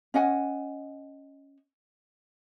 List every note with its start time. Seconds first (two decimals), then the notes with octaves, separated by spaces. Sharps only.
0.14 C#4 D#5 F#5 G#5